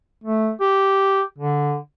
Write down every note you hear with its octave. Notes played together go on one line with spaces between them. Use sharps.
A3
G4
D3